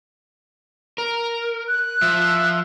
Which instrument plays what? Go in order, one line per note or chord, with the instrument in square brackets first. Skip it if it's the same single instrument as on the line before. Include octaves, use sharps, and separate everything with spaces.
[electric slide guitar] A#4
[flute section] F#6
[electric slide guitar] F3 [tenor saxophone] E5